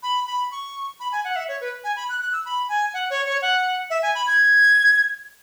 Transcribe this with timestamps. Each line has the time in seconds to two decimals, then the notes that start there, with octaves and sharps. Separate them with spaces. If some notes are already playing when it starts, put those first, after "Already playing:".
0.03 B5
0.27 B5
0.51 C#6
1.00 B5
1.12 G#5
1.24 F#5
1.36 E5
1.48 C#5
1.61 B4
1.84 G#5
1.96 B5
2.09 F#6
2.21 F#6
2.33 E6
2.45 B5
2.69 G#5
2.94 F#5
3.10 C#5
3.26 C#5
3.42 F#5
3.90 E5
4.02 G#5
4.15 B5
4.27 G#6